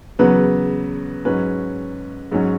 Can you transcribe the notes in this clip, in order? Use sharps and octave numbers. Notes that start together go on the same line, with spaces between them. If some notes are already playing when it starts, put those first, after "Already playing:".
E2 C#3 F#3 B3 B4
G#2 F#3 C#4 B4
G#2 F#3 C#4